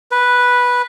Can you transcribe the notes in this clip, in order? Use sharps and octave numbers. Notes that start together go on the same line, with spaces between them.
B4